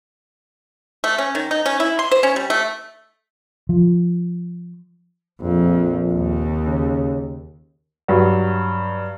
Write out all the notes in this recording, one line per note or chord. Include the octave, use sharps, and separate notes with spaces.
A3
C#4
D#3
D#4
C#4
E4
C6
C5
C#4
G3
A3
F3
A#1 F2
D#2
C#3
G2 F#3